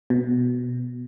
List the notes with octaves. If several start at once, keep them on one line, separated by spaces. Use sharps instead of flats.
B2